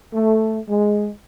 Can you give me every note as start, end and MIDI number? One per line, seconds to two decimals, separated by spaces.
0.14 0.57 57
0.69 1.08 56